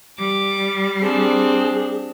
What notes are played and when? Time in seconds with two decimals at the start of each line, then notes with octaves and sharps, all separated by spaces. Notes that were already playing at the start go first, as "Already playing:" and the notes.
0.19 G3 D6
1.01 C4 D4 G#4